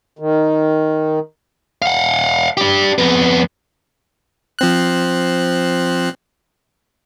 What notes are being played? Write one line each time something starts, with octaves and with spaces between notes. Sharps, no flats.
D#3
F5 F#5
D4 G4
F2 B3
F3 C4 F#6